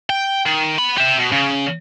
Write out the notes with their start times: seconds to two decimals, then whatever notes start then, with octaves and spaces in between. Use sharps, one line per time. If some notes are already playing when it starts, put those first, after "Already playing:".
0.09 G5
0.46 D#3
0.79 B3 B5
0.98 G4 E5
1.18 B2
1.32 C#3